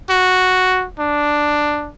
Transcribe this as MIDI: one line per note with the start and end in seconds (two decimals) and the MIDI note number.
0.10 0.86 66
0.99 1.90 62